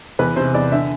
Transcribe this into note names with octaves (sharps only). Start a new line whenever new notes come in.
E2 B4
C3 C5
E2 D5
D3 E5